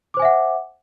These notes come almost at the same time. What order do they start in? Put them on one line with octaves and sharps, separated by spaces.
D6 C5 G#5 E5 F#5